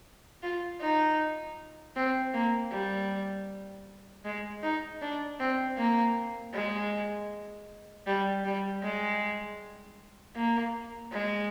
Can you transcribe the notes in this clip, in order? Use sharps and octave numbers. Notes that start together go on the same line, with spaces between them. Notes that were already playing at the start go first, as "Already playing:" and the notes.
F4
D#4
C4
A#3
G3
G#3
D#4
D4
C4
A#3
G#3
G3
G3
G#3
A#3
G#3